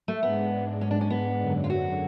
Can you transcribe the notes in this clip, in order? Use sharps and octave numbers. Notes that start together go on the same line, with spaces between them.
A3
G#2 G#3 B3 D4
C#4
D4
C#4
B3
F#2 D3 F#3
F4
F#4